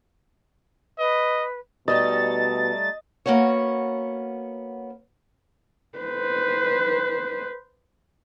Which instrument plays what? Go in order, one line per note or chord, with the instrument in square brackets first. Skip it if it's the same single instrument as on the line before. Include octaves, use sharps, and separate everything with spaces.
[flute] B4 [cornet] D#5
[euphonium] B2 [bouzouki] G3 A3 D#4 [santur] D#5 [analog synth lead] A6
[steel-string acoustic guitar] A#3 B3 C#4 F#4 C#5
[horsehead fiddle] B4 C5